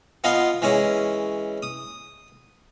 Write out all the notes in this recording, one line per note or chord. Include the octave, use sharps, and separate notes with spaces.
B3 F4 D#5 F5 G#5
E3 G#3 C#4
D#6